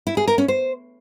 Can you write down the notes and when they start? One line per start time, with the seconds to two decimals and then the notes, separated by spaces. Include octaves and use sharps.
0.07 E4
0.17 G#4
0.28 A#4
0.38 C#4
0.48 C5